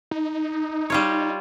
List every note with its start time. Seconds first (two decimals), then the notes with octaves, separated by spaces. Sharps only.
0.11 D#4
0.90 G3 F4 C#5